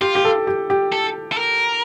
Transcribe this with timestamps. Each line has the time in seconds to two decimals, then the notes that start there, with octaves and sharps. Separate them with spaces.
0.01 F4 G4
0.15 G4
0.25 A4
0.47 G4
0.70 G4
0.92 A4
1.32 A4
1.37 A#4